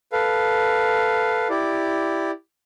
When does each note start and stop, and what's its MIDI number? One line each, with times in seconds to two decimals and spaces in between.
0.12 1.48 69
0.12 1.48 71
0.12 1.48 77
1.50 2.31 64
1.50 2.31 67
1.50 2.31 74